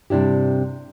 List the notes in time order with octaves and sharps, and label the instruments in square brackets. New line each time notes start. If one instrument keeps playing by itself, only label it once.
[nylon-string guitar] G2 C3 D4 E4 G4